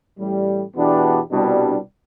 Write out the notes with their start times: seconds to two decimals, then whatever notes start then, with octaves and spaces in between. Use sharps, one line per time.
0.18 A1 A2 G3
0.74 E2 B2 B3 D4 G4
1.31 C2 B2 G3 D4